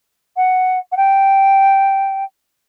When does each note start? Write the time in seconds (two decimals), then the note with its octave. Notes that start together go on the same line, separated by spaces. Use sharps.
0.37 F#5
0.92 F#5
0.97 G5